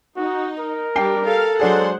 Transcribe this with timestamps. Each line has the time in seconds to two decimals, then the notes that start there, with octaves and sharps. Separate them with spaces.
0.17 D#4 F#4
0.59 A#4
0.96 G3 D4 G5 C7
1.26 A4 F5
1.60 F#3 G#3 D4 G#4 C5 F#5